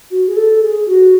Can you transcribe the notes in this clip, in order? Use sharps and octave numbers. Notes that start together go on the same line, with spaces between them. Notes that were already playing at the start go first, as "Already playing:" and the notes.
F#4
G#4
A4
G#4
G#4
F#4